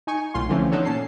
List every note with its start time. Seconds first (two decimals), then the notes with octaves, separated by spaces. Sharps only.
0.07 D#4 G#5 C#6
0.34 B1 A2 F4 C6
0.49 D3 E3 F3 A3 C4 C#4
0.71 B3 D4 D#4 A4 C#5
0.85 A#2 C#4 A5 C7